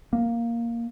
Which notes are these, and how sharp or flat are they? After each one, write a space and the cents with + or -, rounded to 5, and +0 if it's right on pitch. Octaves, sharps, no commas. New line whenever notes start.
A#3 +0